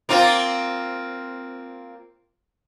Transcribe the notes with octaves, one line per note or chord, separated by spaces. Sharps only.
A#3 C4 F4